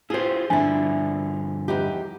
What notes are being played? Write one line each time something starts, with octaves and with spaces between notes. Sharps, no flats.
E4 F4 G4 G#4 C5
G2 D3 F3 D4 E4 G#5
E2 D#4 G4